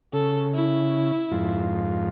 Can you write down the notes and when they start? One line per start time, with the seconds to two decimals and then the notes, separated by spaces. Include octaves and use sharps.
0.13 C#3 A4
0.54 E4
1.32 F2 G#2 F4